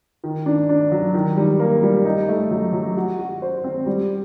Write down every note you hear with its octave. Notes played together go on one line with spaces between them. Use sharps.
D#3
D4
D4
F#3
D#3
G3
A#3
G3
D#4
A3
F#3
F#3
F#4
F#4
C5
C4
G3